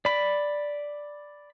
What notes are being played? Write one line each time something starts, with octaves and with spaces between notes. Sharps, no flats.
D5 B5